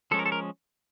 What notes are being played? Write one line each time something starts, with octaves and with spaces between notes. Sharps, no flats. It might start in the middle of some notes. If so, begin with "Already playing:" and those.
F3 G#3 C#4 A4
A#4
A4
A#4